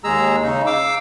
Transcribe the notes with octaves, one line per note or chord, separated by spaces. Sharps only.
D#2 G#3 G#4 A#5 E6
C#3 D#4
F5 D6 E6